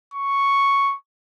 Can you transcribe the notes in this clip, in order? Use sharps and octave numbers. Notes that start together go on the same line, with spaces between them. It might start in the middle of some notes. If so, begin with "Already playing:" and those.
C#6